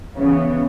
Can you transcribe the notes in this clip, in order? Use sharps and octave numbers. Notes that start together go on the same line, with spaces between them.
C#3 E3 B3